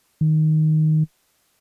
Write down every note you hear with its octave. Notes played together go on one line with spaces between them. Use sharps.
D#3